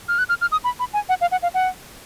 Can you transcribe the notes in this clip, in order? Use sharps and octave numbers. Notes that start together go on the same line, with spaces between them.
F6
F#6
F6
F6
D#6
B5
B5
G#5
F#5
F5
F#5
F5
F#5